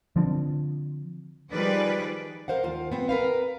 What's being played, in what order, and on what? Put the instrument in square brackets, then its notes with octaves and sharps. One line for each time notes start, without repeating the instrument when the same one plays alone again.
[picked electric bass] D3 F3 C4 D4
[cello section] D#3 F3 G3 G#4 B4 D5
[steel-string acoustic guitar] A#4 C5 F5 F#5
D#2 F4 F5
B3 C4
A#4 B4 F5